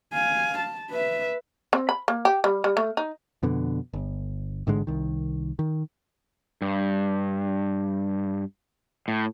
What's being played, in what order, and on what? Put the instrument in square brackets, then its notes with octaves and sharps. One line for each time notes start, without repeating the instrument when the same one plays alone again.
[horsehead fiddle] F5 G#5
A5
B4 E5
[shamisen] C4
B5
A#3
G4
G3
G3
A3
D#4
[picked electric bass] F2 B2 D3
G1
A1 G#2 D3 G#3
C2 D#3
D#3
[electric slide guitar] G2
A2